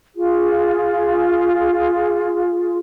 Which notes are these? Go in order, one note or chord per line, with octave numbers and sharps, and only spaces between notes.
F4 G#4